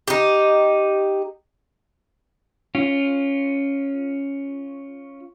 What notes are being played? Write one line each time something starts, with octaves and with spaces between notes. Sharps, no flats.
D#4 G4
C#4 F4